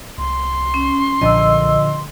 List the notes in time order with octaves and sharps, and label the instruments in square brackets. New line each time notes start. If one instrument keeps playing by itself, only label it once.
[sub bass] C2 [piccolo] C6
[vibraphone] C#4
[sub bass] B1 [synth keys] A#2 D3 F3 [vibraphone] D#5 E6